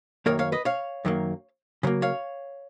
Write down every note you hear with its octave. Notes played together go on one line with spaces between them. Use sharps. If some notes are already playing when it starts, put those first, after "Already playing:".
F#2 D#3 A#3 A#4 C#5
C#5 F5
B4 D#5
C#5 F5
F#2 D#3 F#3 A#3
C#3 F#3 A#3
C#5 F5